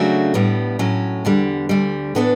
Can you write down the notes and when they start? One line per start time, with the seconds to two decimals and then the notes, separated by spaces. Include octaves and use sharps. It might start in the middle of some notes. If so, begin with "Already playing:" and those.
Already playing: C#3 F#3 A3 D4 F#4
0.34 A2 G3 B3
0.79 A2 F#3 C#4
1.25 E2 D3 G3
1.69 D2 D3 G3
2.15 A2 E3 B3 D4 A4